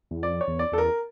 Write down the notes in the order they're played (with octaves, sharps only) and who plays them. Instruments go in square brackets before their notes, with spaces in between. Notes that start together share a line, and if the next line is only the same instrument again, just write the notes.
[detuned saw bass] E2
[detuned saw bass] F2 [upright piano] D5
[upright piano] C#5
[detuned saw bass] E2
[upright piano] D5
[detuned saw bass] E2 [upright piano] A4
[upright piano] A#4